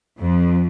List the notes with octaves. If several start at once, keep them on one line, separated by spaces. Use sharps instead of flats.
F2